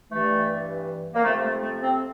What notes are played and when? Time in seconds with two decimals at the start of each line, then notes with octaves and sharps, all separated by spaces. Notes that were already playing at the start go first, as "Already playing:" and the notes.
0.10 G2 E3 A3
1.13 A#3
1.23 F2 C3 F3 A3
1.42 A3
1.62 A3
1.80 C3 C4